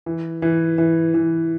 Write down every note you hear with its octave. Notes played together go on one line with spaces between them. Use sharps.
E3
E3
E3
E3